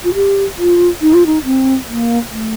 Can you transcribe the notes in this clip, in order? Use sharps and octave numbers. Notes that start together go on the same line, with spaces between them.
F4
G4
F4
D#4
F4
D#4
C4
A#3
A3